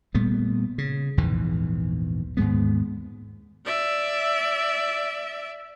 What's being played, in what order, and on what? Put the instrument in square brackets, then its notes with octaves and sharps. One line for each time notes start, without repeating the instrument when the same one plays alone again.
[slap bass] A#2 G3 A3 B3
C#3
A#1 E2 G#2 E3
D#2 G#2 G#3 B3
[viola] D5 E5